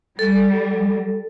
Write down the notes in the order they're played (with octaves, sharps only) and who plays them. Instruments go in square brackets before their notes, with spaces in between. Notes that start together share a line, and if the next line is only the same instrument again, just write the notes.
[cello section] G3 [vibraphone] A4